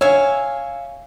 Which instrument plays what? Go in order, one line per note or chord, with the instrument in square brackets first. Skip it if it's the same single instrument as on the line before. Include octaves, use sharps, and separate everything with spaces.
[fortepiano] C#5 [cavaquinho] E5 F5 G#5